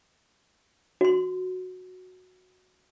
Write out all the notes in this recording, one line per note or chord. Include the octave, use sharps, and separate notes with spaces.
F#4 C6